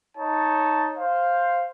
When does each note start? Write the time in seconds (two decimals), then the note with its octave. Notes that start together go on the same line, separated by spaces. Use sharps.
0.17 D#4 C#5 A5
0.98 C5 F5